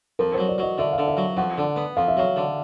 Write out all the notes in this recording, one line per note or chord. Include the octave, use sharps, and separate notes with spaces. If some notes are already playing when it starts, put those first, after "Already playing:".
F2 A#4
F#3 C5
D5
F#3 D#5
D3 E5
F5
D3
E5
F#3
F2 F#5
D3
B3
F2 F5
E5
F#3 F5
D3